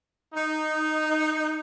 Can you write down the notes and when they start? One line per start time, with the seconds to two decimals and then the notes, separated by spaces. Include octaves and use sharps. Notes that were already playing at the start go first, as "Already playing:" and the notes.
0.34 D#4